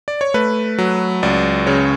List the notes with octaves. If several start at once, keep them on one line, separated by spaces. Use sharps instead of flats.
D5
C#5
A3 B4
F#3
C#2 D5
C#3 C#5